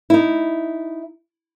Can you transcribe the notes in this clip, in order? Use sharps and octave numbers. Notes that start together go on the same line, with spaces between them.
D#4 E4